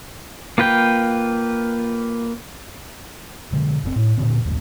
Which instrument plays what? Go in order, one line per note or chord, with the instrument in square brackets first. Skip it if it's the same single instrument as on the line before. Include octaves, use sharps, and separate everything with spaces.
[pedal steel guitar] A#3 F4 B4 G5
[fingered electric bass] B2 D3 G#3
F1 C#3 C4
A2
A#2 D3 D#3 C4
D#1 A#1 D#2 G#2